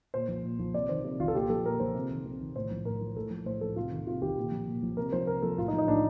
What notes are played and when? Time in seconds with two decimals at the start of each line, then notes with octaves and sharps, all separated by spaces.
0.14 A#2 C5
0.28 F3
0.44 A#2
0.59 F3
0.74 C3 D5
0.89 D#3 C5
1.05 C3
1.20 D#3 F4
1.28 A4
1.35 A#2 G4
1.50 F3 A4
1.65 A#2 A#4
1.80 F3 C5
1.95 C3
2.10 D#3
2.26 C3
2.40 D#3
2.56 A2 C5
2.71 F3
2.85 A2 A#4
3.01 F3
3.16 A2 A4
3.31 F3
3.46 A2 C5
3.61 F3 A4
3.76 C3 F4
3.92 D#3
4.06 C3 F4
4.22 D#3 G4
4.37 A#2
4.52 F3
4.67 A#2
4.83 F3
4.97 C3 A#4
5.12 F3 C5
5.27 C3 A#4
5.42 F3 A4
5.58 A2 F4
5.68 D#4
5.73 F3
5.78 D#4
5.87 A2 D4